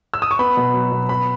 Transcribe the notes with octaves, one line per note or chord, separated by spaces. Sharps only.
E6
D#6
C#6
B3 B5
B2
F#3
B2
B3 B5